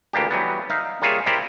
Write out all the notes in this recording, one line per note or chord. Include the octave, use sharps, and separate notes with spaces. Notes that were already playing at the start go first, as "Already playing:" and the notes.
D2 E3 A#3 D4 G4
E3 F#3 G3 B3
D#4 E5 F5
G3 A#3 F4 G#4 C#5 E5
E4 G4 A#4 C5 D5